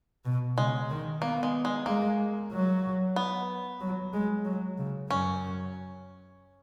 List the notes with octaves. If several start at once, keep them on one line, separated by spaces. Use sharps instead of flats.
B2
C#3 G#3
D#3
A#3 B3
G#3
G#3
G#3 A#3
F#3
B3
F#3
G#3
F#3
C#3
F#2 C#4